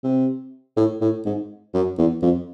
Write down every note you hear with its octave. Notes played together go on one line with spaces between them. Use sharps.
C3
A2
A2
G#2
F#2
E2
F2